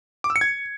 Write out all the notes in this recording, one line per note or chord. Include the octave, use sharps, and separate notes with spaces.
D6
E6
C#7
G#6